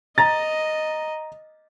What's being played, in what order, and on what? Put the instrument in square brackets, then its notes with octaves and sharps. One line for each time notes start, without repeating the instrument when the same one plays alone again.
[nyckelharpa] D#5 [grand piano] A#5 A6